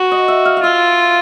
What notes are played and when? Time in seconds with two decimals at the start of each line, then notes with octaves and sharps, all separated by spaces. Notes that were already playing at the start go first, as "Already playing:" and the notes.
Already playing: F#4
0.11 D#5
0.28 E5
0.45 F5
0.57 F5
0.63 F4 E5